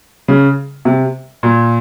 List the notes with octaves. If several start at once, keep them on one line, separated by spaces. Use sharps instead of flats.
C#3
C3
A#2